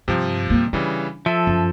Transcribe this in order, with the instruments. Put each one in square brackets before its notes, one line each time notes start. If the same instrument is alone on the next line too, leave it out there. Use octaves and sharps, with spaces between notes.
[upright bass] G2 [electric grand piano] C3 F3
[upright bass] G2 A#3
[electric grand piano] C#3 E3 G3 [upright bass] D4
[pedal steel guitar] F3 A4 [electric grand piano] E5
[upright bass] F#2